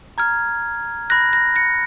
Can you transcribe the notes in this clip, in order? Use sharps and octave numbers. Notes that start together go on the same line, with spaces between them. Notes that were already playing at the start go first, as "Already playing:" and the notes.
A#5 F6 G#6
B5 F#6 A#6
A#6
A#6 C#7